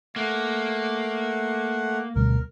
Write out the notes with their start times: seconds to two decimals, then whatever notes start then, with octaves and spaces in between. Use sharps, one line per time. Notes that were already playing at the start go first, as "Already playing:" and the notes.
0.16 A3 A#3 F#5
2.16 D2 B2 G3 A#4